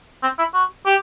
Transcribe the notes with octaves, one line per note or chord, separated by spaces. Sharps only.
C4
E4
F#4
G4